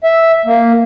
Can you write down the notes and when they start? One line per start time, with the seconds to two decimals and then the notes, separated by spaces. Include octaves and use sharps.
0.04 E5
0.45 A#3